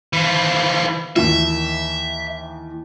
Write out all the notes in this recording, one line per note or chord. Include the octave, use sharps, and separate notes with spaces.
E3 F3
D#2 E3 E5